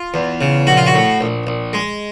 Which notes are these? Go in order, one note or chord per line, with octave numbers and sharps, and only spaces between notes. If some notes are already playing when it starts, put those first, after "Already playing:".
Already playing: F4
E2
C#3
A#1 F#4
F4
F#4
A2
A#1
A#1
G#3